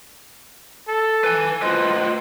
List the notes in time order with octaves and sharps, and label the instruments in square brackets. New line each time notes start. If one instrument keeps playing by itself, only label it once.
[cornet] A4
[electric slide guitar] B4 G#5
[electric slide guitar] F4 B4 D#5 [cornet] C5